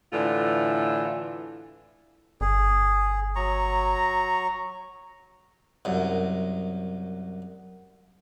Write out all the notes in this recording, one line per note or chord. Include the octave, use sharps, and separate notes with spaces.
A2 D3 E3 F4
G1 G#4
F#3 A#5 C#6
C2 F#2